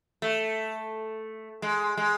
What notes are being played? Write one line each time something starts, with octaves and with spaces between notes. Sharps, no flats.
A3
G#3
G#3